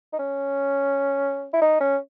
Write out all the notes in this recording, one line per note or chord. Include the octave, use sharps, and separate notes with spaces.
D#4
C#4
E4
D#4
C#4